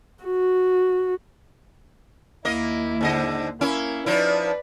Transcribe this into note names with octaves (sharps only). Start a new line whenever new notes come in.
F#4
D#2 A#3 E4 D#5
G#2 D3 D#5
A#3 C#4 E4
F3 D#4 E4 B4 D5